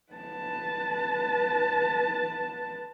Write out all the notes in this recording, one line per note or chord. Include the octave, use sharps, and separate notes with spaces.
B4 A5